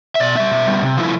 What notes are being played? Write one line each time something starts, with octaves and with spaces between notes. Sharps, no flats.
E5
B2 D5
G3 B3 E5
B2
G3 B3
C3
F3 A3 E4